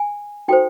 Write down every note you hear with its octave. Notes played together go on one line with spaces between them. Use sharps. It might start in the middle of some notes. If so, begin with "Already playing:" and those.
Already playing: G#5
D#4 F#4 A4 C5 G5